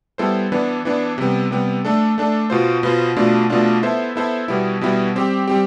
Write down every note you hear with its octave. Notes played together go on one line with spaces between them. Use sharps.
G3 B3 E4 A4 C5
E3 B3 D4
E3 B3 D4
C3 G3 B3
C3 G3 B3
A3 D4 A4
A3 D4 A4
B2 B3 F4 C5
B2 B3 F4 C5
B2 A3 D4 F4
B2 A3 D4 F4
B3 E4 A4 C5 E5
B3 E4 A4 C5 E5
B2 G3 B3 E4
B2 G3 B3 E4
G3 C4 G4
G3 C4 G4